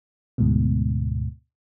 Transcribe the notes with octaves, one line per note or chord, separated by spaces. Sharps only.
D2 G#2 B2